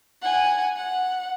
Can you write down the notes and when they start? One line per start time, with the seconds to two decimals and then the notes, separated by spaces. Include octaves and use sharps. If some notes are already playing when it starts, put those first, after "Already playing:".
0.22 F#5 G#5
0.76 F#5